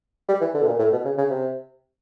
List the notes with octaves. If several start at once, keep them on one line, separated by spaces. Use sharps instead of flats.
G3
E3
D3
B2
A#2
A2
B2
C#3
C#3
C3